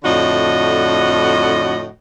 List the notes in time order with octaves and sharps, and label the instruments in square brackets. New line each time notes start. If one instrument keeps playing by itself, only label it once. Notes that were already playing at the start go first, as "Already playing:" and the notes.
[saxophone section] F2 A2 D3 F#4 D#5